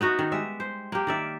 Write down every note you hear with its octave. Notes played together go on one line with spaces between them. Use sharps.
B3 D#4 F#4 E5
D#3
G3 G#3 E5
C5
A#3 G4
D#3 D5 E5